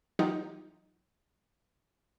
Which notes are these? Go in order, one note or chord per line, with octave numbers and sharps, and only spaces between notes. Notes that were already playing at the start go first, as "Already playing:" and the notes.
E3 F#3 D#4 F4 G4